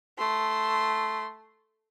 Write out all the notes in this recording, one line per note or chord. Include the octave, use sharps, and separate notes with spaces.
A3 C6